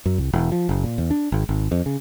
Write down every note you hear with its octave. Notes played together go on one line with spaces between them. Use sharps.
F#2
C2
E1
F3
F#1
A#2
E2
D4
G#1
G#1
F2
C#3